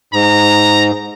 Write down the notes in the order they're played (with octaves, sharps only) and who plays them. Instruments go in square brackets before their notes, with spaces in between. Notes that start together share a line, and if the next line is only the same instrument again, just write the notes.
[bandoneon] G#2 [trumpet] A#5